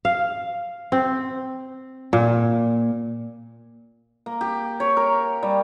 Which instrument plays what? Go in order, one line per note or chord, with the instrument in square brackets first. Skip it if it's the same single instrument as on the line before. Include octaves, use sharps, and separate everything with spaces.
[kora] F5
C4
A#2
[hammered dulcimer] A#3
G4
C#5
A#4
G3